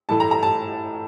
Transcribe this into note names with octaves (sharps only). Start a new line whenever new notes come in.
A2 E3 A3 A5
A#5
A#5
A5